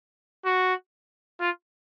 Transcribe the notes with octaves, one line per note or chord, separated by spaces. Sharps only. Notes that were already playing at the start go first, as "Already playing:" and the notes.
F#4
F4